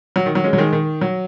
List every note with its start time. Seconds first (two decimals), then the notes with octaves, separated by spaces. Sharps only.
0.16 F#3
0.26 D#3
0.35 F#3
0.44 G#3 C#4
0.53 F#3
0.58 D#3 G#3
0.73 D#3
1.01 F#3